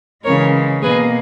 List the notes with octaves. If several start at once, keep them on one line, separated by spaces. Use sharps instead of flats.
C#3 E3 G#3 A#4 C#5
B2 A#3 G#4 B4